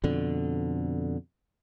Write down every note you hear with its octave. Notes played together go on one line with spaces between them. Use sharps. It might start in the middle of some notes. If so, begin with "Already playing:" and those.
F2 B2 D3